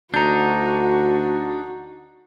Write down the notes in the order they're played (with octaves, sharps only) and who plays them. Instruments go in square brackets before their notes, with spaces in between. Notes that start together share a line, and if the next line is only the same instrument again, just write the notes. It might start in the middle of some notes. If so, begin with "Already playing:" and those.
[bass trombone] D2 [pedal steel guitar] D4 D#4 [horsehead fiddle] F#4 [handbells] A#5 G6